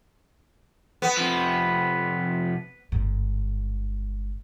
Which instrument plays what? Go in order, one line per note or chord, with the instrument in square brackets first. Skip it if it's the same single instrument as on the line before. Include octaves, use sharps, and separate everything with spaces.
[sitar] B3
[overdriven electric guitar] C3 F3
[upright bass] G1 G#2